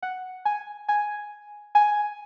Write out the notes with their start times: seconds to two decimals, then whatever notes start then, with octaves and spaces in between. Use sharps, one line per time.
0.03 F#5
0.45 G#5
0.88 G#5
1.75 G#5